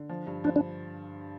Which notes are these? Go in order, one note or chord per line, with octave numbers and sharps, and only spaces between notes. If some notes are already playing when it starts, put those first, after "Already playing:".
Already playing: D3
F3
G2
F3 D4
D4